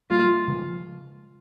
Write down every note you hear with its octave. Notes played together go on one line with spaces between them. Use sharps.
A#2 G3 A#3 F4
C#3 F3 G#3